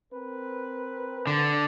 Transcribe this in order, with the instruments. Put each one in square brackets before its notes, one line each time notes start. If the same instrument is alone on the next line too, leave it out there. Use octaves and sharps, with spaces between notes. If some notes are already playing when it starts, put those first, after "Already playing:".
[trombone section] C4 A#4 B4
[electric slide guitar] D3